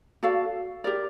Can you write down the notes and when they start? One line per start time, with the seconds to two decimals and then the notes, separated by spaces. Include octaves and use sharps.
0.23 F#4 A4 D5 F5
0.84 G4 A#4 D5